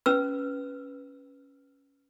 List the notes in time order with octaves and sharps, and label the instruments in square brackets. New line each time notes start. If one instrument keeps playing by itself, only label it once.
[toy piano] C#4 B4 E6